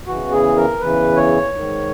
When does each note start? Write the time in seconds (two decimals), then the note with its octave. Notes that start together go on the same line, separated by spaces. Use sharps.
0.08 E2 C#3 E3 F#4
0.32 G#4
0.56 A#4
0.80 E2 C#3 E3 B4
1.16 C#5
1.53 G#2 D#3